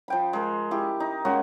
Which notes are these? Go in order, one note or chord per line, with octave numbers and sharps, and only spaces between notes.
F3 G5 B5
G#3 A#4
E4 G4
D#4
G#3 A#3 C#4 F#4